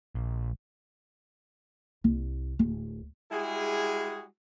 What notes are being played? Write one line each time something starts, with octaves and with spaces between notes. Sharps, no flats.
A#1
C2
D1
G3 G#3 E4 F#4 G#4